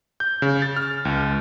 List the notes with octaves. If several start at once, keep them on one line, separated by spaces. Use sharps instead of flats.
G6
C#3
A6
F6
C#2